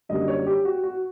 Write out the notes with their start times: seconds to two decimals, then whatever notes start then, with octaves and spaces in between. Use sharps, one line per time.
0.09 F#2 D3 G3 A#3 D4 D#5
0.28 C#5
0.47 G4
0.65 F#4
0.83 F#4